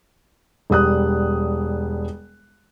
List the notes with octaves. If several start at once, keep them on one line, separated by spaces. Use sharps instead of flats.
E1 G3 D#6 F#6